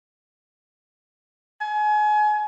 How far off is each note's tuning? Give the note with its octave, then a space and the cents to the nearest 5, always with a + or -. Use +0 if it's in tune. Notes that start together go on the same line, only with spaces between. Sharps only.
G#5 +30